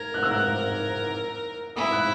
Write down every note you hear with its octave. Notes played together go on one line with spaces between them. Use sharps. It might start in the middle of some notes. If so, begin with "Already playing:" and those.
Already playing: A#4 G#6
F#6
E6
F#6
E4 D#6
F#6